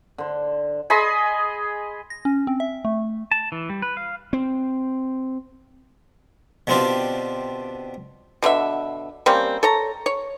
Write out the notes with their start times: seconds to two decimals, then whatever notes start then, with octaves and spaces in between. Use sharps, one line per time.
0.18 D3 C5
0.90 G#4 D#5 B5 C6
2.10 A#6
2.25 C#4
2.47 C4
2.60 E5
2.85 A3
3.31 A5
3.52 E3
3.70 G3
3.82 B4
3.97 F5
4.33 C4
6.67 B2 D3 C4 D4 F4 G4
8.42 B2 D3 D4 E5
9.26 G3 A#3 C4 C#4
9.63 A4 C#5 A#5
10.06 C#5